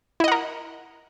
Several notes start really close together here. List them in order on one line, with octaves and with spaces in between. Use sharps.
E4 D#5 F#5 A#4